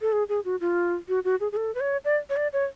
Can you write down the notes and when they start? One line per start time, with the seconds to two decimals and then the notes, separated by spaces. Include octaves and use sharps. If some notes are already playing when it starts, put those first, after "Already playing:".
0.01 A4
0.12 G#4
0.29 G#4
0.45 F#4
0.61 F4
1.08 F#4
1.24 F#4
1.40 G#4
1.52 G#4
1.57 A4
1.75 B4
1.80 C#5
2.05 D5
2.30 C#5
2.37 D5
2.53 C#5